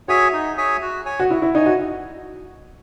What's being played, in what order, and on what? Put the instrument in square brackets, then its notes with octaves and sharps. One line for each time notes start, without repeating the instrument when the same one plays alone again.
[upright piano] F#4 [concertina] G#4 C#5 E5 G#5
[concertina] D#4
G#4 C#5 E5 G#5
F#4
C#5 G#5
[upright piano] F#4
[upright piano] E4 [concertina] F#4
[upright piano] E4
[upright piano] D#4 [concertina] C#5 G#5
[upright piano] F#4